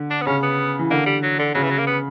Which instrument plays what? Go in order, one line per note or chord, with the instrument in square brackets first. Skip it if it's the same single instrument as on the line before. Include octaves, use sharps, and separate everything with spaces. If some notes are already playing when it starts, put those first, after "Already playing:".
Already playing: [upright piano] D3
[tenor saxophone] D4
B3
[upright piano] C#3 [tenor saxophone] C#4
[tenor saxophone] B3
[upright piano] E3
[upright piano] D3 [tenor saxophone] A#3
[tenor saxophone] G3
F#3
D3
[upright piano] C#3 [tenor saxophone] F#3
[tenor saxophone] E3
F#3
A#3
B3